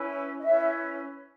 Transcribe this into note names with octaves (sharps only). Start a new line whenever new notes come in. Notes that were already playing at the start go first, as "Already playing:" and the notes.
Already playing: C#4 E4 B4
D#5
C#4 E4 B4 E5